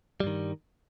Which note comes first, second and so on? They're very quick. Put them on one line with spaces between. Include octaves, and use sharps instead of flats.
G3 G2 D#3